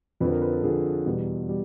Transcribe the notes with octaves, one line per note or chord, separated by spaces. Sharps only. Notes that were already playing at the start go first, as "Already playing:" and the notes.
F2 D3 F3 B4
A#4
B4
A4
F2 D3 F3 G#4
E2 B2 G3
G3